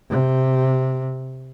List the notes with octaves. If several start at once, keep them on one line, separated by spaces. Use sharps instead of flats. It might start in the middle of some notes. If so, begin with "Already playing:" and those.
C3